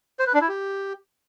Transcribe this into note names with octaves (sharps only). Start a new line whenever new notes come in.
C5
B4
D4
E4
G4